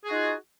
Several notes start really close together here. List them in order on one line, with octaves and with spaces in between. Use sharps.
G#4 F#4 D#4 F4